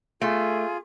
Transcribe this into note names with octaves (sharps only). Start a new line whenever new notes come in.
A3 F4 G#4